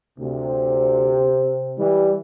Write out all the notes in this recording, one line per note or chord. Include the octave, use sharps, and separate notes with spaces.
D2 C3
E3 G3